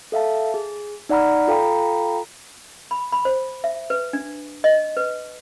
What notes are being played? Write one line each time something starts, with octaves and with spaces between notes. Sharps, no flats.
A4 E5 F5 A5
G#4
D#4 D5 F#5 A#5 B5 F6
F4 A4 F5 G5 A#5 B5
B5
B5
C5
E5
B4
D4
D#5
B4